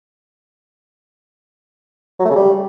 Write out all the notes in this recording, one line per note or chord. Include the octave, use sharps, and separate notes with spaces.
F#3
A3
C#3
G3